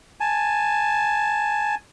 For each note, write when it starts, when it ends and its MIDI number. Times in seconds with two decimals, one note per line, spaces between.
0.20 1.75 80
0.20 1.75 81